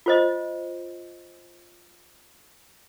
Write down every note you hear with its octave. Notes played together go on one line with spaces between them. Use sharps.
F4 C5 D#5